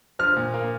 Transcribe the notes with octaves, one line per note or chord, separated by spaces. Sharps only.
F3 F6
A#2
A#3